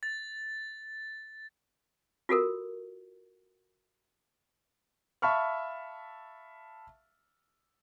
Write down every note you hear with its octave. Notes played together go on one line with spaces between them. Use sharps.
A6
F4 F#4 A4 A#4
E5 F5 A5 B5 C#6 F6